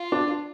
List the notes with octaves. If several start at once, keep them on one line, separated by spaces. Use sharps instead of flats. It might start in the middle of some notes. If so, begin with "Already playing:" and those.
Already playing: F4
D4